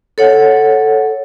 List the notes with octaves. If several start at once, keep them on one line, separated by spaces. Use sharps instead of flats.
A4 C#5 F#5